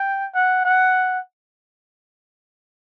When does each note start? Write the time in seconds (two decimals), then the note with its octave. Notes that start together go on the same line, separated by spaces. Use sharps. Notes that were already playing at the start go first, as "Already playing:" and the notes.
Already playing: G5
0.34 F#5
0.65 F#5